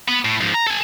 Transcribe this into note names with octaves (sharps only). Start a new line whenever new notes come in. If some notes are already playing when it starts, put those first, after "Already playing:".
B3
A2
G#2 F3
A#5
A4 G#5